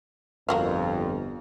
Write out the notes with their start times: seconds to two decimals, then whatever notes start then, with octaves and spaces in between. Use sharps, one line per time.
0.49 G1 F2 A#3 F#4 F5